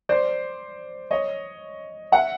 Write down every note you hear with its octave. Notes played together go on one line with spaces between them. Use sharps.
C5 D5
C#5 D#5
E5 F#5